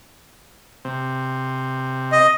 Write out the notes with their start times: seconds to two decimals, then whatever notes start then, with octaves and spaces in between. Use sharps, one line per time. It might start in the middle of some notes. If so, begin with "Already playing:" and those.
0.85 C3
2.12 D#5